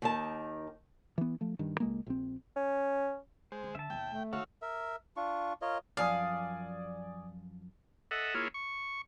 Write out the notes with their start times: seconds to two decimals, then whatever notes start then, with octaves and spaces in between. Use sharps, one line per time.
0.02 D#2 D#3 A5
1.18 E3 B3
1.41 F3 A3
1.59 G2 D#3
1.80 C#2 G#3 A#3
2.07 A#1 C4
2.56 C#4
3.52 G#3 C5
3.63 D#3
3.75 D3 E5 A5
3.90 D#2 B2 G5
4.10 A3
4.33 D#3 F#4 A4 C#5 F5 E6
4.62 A#4 E5
5.17 D4 F4 C#6
5.62 F4 A#4 C#5 D#5
5.97 F#2 F3 D5 F5 G#5 D#6
8.11 A4 D#5 E5 F#5
8.34 A#3 E4 F4 G#4 C#5
8.54 C#6